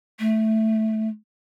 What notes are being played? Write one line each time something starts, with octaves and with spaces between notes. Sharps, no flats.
A3